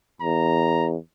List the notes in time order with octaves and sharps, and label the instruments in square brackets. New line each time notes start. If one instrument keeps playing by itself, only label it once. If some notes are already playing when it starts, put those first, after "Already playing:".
[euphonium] E2 [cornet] A#5